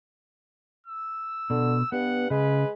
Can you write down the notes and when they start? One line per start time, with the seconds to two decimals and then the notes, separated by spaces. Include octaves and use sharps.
0.87 E6
1.50 B2 D3
1.92 G2 B3 F#5
2.30 C#3 G#3 B4